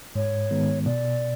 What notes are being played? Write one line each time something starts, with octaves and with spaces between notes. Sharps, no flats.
G#2 C#5
D#3 G#3 B3
B2 D5